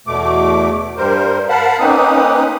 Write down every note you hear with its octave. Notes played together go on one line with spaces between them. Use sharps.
E2 B2 A3 D6
G2 G3 A#4 C5
A#4 F5 F#5 A5 B5
A#3 C4 C#4 D#4 B4 D#6